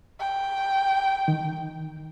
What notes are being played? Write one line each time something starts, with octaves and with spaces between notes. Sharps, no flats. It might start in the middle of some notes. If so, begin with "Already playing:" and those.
G5
D#3